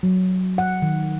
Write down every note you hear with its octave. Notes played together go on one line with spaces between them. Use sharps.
F#3
F#5
D#3